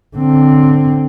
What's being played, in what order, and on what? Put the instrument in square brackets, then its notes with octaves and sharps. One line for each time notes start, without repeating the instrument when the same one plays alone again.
[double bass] D3 C4